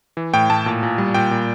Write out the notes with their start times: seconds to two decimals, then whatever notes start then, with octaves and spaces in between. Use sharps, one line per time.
0.17 E3
0.34 A2 G5
0.50 A2 A5
0.66 A#2
0.83 A#2
0.98 G3
1.14 A#2 G5
1.31 A#2